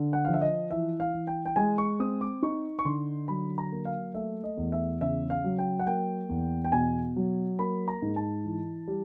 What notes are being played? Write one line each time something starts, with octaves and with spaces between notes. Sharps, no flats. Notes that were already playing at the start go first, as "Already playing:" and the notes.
Already playing: D3
F#5
F3 F5
E5
D#5
E3 E5
F5
E3
G5
G5
G#3 G#5
C#6
C4 D#6
D6
D#4 C#6
C#6
D3 C6
F#3 B5
A#5
A#3
F5
A3 E5
D#5
E2
E5
C#3 E5
F5
F#3
G5
F#5
A#3 G5
E2
G5
B2 G#5
F#3
A#3 B5
A#5
G#2
A5
E3
G3